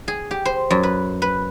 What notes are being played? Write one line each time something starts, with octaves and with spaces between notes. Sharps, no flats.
G#4
G4
C5
F#2
B4
B4